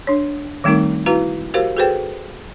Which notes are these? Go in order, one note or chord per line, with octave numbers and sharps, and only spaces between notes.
D4 C#5
D#3 G3 A3 C4 D#4 A#4
E4 F#4 B4 F5 A#5
F#4 G4 A#4 C5 F5
F#4 G#4 A4 B4 C5 G5